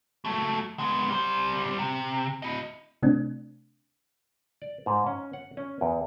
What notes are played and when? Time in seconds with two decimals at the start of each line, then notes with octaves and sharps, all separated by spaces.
0.25 F#3 A3
0.79 G#3 B3
1.10 G3 C5
1.78 C3
2.42 E4 D#5
3.03 C3 A3 C4 D4
4.62 D5
4.86 G#2
5.07 C#4
5.33 F#5
5.57 C#4
5.81 E2